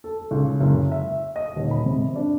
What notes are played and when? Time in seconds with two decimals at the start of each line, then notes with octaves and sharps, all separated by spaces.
0.04 A4
0.31 C#2
0.60 F#1
0.92 E5
1.36 D#5
1.56 D#1
1.71 B5
1.86 C3
2.16 D4